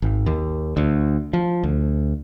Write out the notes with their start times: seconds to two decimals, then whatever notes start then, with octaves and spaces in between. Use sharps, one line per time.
0.02 G#1
0.26 D#2
0.77 D2
1.33 F3
1.63 D2